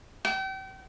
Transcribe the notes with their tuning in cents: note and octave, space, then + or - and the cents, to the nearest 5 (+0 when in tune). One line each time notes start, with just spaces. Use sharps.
G5 -35